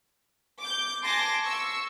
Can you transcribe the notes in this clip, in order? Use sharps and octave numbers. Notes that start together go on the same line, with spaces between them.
D6 G6
G#5 A5 C6 D6 A#6
C#6 E6